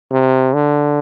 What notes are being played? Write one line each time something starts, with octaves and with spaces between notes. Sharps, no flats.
C3
D3